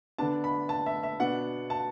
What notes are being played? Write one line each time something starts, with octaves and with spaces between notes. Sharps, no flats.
D3 B3 D4 A5
B5
A5
E5
E5
B2 B3 D4 F#5
A5